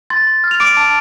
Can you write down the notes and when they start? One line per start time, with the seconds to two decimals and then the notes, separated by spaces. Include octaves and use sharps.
0.10 C6 A6
0.27 C6
0.44 F6
0.51 F7
0.60 D6 D7
0.77 A5